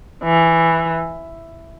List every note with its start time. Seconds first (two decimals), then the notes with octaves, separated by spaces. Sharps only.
0.23 E3